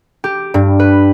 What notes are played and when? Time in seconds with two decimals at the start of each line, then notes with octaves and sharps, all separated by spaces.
0.24 G4
0.54 G2
0.80 B4